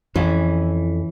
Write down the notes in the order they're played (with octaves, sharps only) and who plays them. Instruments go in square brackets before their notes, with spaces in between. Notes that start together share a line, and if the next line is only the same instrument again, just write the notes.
[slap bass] F2 [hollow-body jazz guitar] E3 C#4